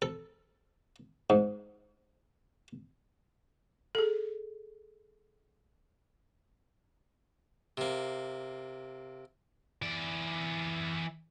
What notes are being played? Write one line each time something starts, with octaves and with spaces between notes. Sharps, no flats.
A4
G#2
G#4 A4
C3 A#3
E3 D5